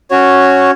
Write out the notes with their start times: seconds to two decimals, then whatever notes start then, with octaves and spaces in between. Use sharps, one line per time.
0.11 C#4 F#4 C#5